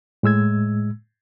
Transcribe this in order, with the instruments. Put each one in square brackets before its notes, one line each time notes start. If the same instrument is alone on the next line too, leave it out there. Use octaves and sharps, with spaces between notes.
[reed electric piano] A2 G#3 E6 G#6